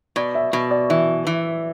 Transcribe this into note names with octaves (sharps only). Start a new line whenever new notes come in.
B2 D5
E5
B2
D5
E3 E5
E3